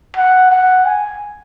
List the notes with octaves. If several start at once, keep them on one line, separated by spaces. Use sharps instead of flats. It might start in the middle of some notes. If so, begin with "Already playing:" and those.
F#5
F#5
G#5